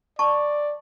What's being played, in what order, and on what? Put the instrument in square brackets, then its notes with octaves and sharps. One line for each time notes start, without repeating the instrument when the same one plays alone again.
[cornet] D5 [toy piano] A5 C#6